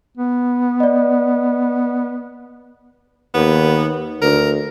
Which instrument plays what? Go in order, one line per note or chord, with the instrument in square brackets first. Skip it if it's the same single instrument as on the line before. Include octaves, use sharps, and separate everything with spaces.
[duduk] B3
[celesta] D5 D#5
[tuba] D#2 [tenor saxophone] B3
[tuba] D2 [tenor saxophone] A#4